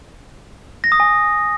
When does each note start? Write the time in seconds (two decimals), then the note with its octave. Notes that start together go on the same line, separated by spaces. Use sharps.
0.84 A#6
0.92 D#6
1.00 G#5